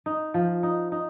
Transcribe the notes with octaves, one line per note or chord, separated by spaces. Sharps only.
D#4
F3
D#4
D#4